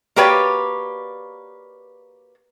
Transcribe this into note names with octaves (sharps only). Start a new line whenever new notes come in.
A#3 F#4 G4 B4 C#5 D5